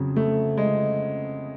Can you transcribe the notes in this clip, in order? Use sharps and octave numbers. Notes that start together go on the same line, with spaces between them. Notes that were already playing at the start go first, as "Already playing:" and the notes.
Already playing: F2 C#3 F#3
A3
G#3